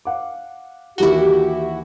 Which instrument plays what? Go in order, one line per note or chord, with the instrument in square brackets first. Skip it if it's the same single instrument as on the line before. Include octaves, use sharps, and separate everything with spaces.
[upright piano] F5 F#5 D6
[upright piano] D#2 E3 G7 [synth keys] E4 F#4 [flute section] G4